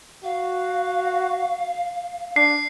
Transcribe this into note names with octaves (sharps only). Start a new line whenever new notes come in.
F#4 F5
D4 C7